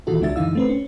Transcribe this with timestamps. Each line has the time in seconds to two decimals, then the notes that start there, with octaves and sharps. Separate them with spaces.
0.07 A#2 D#3 E3 F4 F#4 A4
0.21 C#2 G#3 D4 E5 A6
0.36 F#2 D3 E3 D#4 F5 E6
0.55 A3 C4 B4
0.69 C#4